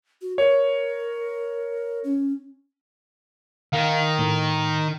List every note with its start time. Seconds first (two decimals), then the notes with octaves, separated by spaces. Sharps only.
0.22 F#4
0.38 A#4 C#5
2.04 C#4
3.73 D#3 F5
4.19 A2